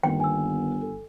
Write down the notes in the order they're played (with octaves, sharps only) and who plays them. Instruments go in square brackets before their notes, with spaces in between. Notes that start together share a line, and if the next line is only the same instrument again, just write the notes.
[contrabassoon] G1 [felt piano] D#3 A#3 B3 [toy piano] G5
[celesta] G#5 E6
[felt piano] A4